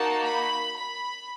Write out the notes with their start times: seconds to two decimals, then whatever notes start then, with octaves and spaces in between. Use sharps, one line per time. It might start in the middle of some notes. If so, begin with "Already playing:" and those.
Already playing: A#3 D#4 F#4 A5
0.25 B5
0.76 B5